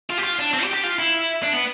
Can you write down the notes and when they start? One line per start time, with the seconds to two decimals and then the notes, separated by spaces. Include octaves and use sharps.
0.10 F4
0.18 G4
0.24 F4
0.39 D4
0.54 C4
0.63 G4
0.73 G4
0.83 F4
0.99 E4
1.43 D4
1.53 B3